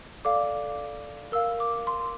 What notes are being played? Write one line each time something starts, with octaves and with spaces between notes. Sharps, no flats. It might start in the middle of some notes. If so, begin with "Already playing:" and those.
A4 D5 F5 D6
A#4 F5 E6
D6
C6